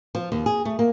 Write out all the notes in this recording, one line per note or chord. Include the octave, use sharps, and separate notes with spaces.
F3
D#2
G#4
A3
A#3